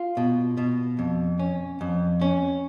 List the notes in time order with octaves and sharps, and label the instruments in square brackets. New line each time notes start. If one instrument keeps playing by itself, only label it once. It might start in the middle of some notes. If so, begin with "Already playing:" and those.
Already playing: [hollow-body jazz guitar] F4
B2
B2
F2
C#4
F2
C#4